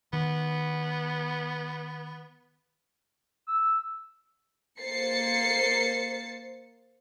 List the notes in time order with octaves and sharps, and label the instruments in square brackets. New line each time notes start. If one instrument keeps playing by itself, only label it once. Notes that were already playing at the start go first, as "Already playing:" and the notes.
[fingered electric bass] D#3 [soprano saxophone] B3
[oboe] E6
[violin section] A#3 C5 A6 C7 C#7